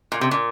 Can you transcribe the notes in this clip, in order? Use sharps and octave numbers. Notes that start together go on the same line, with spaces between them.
A#2
C3
A#2